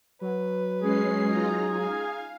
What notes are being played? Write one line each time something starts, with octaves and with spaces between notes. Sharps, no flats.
F#3 B4
G#3 C#4 G#4 C7
D#4 F4 A#5
F5 G#5